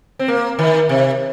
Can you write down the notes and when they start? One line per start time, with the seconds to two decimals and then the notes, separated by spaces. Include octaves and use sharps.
0.19 C4
0.28 A#3
0.59 D#3
0.89 C3